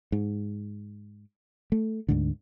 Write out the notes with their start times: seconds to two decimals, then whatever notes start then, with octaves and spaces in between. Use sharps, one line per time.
0.12 G#2
1.72 A3
2.09 D2 G#2 D3